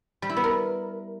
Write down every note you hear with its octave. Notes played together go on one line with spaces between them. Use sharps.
G3
E4
B3
A#4